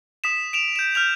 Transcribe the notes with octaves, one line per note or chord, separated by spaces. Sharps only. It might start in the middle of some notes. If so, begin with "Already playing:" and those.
D#6 B6 E7
D7 E7 F7
G6 E7
F6 G6 F7